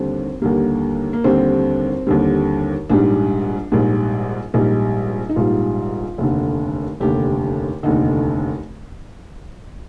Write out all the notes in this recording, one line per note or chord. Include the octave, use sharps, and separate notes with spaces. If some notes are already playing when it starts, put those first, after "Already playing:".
Already playing: D#2 D3 G3 C4
D#2 D3 G3 A#3
A#3
D#2 D3 G3 C4
D#2 D3 G3
A#1 G#2 G3 D4
A#1 G#2 G3
A#1 G#2 G3 D#4
D#4
A#1 G#2 G3 F4
F1 D#2 D3
F1 D#2 D3 G4
F1 D#2 D3 D#4